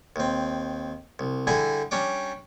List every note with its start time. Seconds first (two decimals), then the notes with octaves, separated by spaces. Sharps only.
0.16 D#2 C4
1.19 C2
1.47 D3 G3 E4 G#4 G#5
1.91 G3 C#4 D4 D6